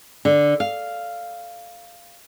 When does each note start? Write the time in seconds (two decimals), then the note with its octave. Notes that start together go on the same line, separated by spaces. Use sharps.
0.25 D3
0.60 F5